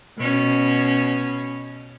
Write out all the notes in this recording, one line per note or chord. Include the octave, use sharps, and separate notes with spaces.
B2 C#4